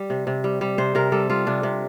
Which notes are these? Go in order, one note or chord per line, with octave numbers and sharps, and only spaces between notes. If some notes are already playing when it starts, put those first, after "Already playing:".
Already playing: G3
C3
C3
G3
G3
C3 C5
C3 A#4
G3 A4
G3 F4
C3 D4
C3